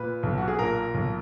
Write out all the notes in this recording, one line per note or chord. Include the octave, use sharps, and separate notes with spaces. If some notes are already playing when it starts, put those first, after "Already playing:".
Already playing: A#2 B4
B1
F#4
G#4
A#2 A#4
B1